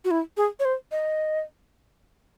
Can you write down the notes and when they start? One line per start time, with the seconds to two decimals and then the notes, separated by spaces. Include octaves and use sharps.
0.05 F#4
0.11 E4
0.37 G#4
0.60 C#5
0.65 C5
0.92 D#5